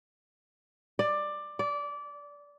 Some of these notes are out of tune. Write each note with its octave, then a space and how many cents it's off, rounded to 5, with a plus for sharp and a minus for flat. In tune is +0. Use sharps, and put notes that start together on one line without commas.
D5 +15
D5 -20